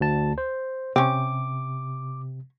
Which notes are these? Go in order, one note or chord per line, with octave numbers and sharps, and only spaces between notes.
D2 A5
C5
C3 C4 C#4 D6